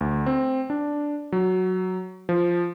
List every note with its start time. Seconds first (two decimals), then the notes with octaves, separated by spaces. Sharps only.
0.01 D2
0.26 C4
0.70 D4
1.32 F#3
2.29 F3